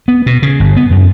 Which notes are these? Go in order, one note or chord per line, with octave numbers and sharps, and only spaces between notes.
B3
B2
C#3
G1
B3
F#2